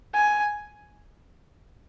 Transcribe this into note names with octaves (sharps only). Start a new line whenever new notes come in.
G#5